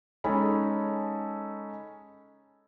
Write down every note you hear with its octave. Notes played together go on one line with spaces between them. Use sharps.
G#3 C#4 D#4 A4 D#5 B5